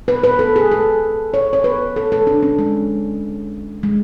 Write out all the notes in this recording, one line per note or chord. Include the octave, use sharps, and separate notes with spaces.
B4
B4
A4
G#4
A4
C#5
C#5
B4
A4
A4
D4
C#4
G#3
G#3